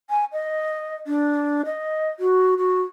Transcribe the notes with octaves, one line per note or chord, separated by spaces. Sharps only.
G#5
D#5
D4
D#5
F#4
F#4